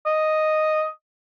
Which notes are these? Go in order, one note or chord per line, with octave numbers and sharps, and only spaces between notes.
D#5